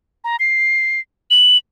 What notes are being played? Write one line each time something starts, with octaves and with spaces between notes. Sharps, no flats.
A#5
C7
F#7